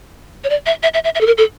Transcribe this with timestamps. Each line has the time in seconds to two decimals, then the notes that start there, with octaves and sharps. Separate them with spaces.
0.44 C#5
0.50 D5
0.66 E5
0.83 E5
0.94 E5
1.04 E5
1.15 E5
1.21 A4
1.26 A#4
1.38 A4